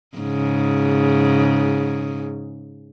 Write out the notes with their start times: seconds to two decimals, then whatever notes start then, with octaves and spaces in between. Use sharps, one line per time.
0.18 G#2 C#3